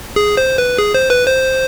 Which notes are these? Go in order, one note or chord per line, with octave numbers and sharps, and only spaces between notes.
G#4
C5
B4
G#4
C5
B4
C5